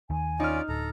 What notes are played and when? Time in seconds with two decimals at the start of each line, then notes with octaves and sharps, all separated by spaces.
0.10 D#2 D#3 G#5
0.40 C#4 D#4 F4 D5 F6
0.69 D1 A4 A#5